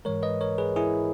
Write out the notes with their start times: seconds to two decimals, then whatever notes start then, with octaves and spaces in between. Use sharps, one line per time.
0.05 G#2 E3 G#3 A#4 C#5
0.23 B4 D#5
0.41 A#4 C#5
0.58 G#4 B4
0.76 E4 G#4